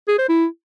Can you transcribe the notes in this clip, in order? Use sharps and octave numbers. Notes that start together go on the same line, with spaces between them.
G#4
C5
E4